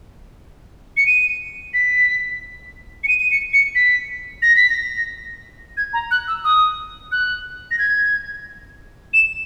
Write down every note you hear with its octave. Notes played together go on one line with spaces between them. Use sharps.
C#7
D#7
B6
C#7
D#7
D#7
C#7
C#7
B6
A#6
B6
A#6
G#6
A#5
F#6
E6
D#6
F#6
A#6
G#6
E7